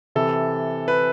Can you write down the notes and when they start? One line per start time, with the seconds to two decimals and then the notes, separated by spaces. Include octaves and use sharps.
0.15 C3 E3 A4
0.88 B4